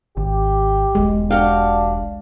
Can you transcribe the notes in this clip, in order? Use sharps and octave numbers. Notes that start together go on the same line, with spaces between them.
G#1 G4
E1 B1 G#3
D4 F#4 G4 F5